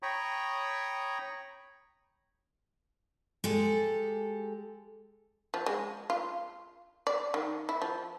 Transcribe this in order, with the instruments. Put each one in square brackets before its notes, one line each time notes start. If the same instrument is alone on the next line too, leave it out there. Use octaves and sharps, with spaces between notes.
[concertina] C#5 G5 A#5 B5 C#6 D#6
[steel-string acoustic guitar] G#3 G4 A4
[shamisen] F3
G#3
F4
D5
D#3
E4
F3